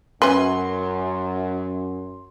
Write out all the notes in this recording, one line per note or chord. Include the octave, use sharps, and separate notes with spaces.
F#2 C#4 B4 C6